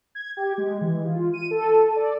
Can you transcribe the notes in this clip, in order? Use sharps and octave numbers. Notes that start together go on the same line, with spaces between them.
G#6
G4
G#3
E3
F4
D#7
A4
D5